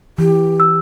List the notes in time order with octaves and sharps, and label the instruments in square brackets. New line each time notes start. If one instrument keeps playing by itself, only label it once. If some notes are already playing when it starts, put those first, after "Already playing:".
[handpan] E3 [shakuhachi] G4
[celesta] E6